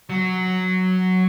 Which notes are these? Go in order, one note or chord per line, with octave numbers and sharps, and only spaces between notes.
F#3